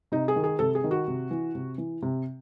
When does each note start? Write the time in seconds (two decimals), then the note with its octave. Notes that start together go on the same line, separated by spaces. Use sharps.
0.12 C3 D#4
0.28 G#4
0.36 D#3
0.44 G#4
0.59 C3 A4
0.75 G#4
0.84 D#3
0.91 F#4
1.08 C3
1.31 E3
1.55 C3
1.78 E3
2.02 C3